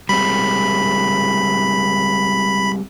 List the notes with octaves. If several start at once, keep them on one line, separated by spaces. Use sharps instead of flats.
G3 G#3 C4 B5